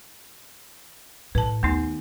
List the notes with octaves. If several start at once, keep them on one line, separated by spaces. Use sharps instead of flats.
A2 B4 A5
D#2 A3 B3 D#4